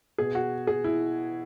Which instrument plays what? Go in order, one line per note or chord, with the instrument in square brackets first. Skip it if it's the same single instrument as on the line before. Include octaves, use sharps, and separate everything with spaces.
[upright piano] B2 G#4
F#4
G#4
E4